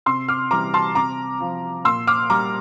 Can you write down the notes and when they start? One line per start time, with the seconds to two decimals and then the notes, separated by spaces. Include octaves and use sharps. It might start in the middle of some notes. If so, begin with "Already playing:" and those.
0.06 C3 C6 E6
0.28 D6 F6
0.51 E3 G3 A#5 D6
0.74 A5 C6
0.95 C3 A#5 D6
1.40 F3
1.85 A#2 C6 E6
2.07 D6 F6
2.30 G3 A#5 D6